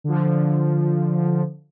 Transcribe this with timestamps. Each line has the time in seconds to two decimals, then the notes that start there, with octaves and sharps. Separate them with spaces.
0.04 D3 F3